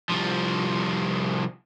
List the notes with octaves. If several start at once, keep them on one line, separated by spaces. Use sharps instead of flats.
C2 F3